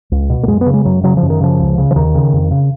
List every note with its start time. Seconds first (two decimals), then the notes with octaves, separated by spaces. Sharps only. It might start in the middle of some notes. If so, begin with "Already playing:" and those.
0.12 C#2
0.30 B2
0.43 A#3
0.48 F#2 G#3
0.61 B3
0.66 C#3
0.74 G#3
0.85 F#2 F#3
1.03 C#3 F#3
1.17 F3
1.23 F#2
1.30 D#3
1.41 C#3 F3
1.59 C#2
1.78 C#3
1.91 F3
1.95 D#2 D#3
2.15 C#3
2.33 F2
2.51 C#3